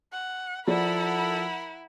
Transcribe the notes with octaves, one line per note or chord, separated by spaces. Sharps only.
F#5
F3 E4 A4 A#4 D5 F#5 B5